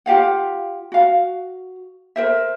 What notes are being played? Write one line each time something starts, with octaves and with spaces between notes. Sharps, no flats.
F4 G4 F5 F#5
F#4 F5
A#4 C5 E5